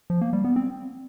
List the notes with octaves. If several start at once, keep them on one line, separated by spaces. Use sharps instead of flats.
F3
A#3
G3
B3
C4